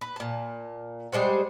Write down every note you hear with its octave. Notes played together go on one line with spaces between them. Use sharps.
B4
A#2 A5
G3 G#3 C5 F#5